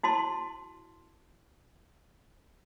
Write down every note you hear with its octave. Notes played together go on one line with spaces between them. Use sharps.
E4 F#4 A5 C6